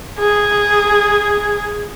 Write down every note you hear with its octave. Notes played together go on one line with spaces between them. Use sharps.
G#4